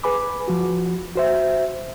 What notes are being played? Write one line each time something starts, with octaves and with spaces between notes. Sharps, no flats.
G#4 B4 G#5 B5 D6
F3 F#4
F#4 C5 E5